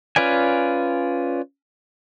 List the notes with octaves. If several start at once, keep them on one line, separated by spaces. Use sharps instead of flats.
C#4 F4 B4 D5 G#5